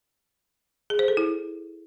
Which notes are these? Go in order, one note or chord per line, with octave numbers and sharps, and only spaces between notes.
G#4
C5
A4
E4